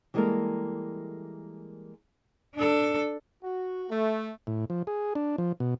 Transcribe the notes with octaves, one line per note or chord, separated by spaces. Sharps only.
E3 G3 G#3 A#3 A4 A#4
D4 A4
F#4
A3
A2
F3
G#4
D4
F3
B2